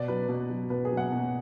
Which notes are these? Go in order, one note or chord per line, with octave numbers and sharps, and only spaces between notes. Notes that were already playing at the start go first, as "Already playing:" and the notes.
Already playing: B2 D5
F#3 B4
B2
F#3
B2 B4
G#4
F#3
F#5
B2